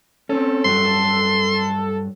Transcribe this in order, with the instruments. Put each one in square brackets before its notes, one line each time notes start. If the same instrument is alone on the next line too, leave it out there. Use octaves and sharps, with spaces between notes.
[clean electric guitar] C4 C#4 [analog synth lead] A4
[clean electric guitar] G2 F#3 [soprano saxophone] C6